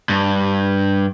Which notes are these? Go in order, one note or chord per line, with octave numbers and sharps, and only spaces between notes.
G2